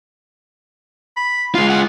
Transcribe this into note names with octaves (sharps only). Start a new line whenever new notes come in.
B5
G#3 F4 C6
F#5